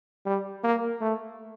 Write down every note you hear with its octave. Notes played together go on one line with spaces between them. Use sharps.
G3
A#3
A3